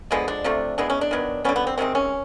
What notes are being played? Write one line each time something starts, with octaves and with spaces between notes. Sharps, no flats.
D3 F3 G#3 B3
D4
C3 F3 A3
E3 G#3 B3 D4
C#4
D4
D#3 F#3 B3
D3 G3 B3 C#4
B3
C4
C3 D#3 G#3 C4
C#4